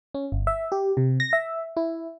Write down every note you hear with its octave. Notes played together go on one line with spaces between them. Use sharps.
C#4
G1
E5
G4
C3
A#6
E5
E4